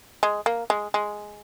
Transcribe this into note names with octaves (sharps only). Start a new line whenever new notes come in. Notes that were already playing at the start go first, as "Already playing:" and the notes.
G#3
A#3
G#3
G#3